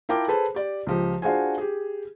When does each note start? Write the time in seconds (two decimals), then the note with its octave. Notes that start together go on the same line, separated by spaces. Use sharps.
0.09 E4 F4 A#4 G5 A5 D6
0.28 G#4 A4 B4 C5 A5
0.55 G4 D5
0.87 C#2 F3 G4
1.22 D4 F4 F#4 G#4 C5 G#5
1.58 G4 G#4